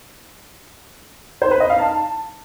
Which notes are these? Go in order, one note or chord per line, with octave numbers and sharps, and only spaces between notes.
C5
B4
D#5
F5
A5